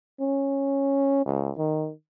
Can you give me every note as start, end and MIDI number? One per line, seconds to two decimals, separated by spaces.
0.20 1.22 61
1.26 1.52 37
1.57 1.92 51